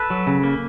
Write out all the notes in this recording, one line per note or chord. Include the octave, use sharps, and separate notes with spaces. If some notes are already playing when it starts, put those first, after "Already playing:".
Already playing: A4 B4
F#3
C#3
A#3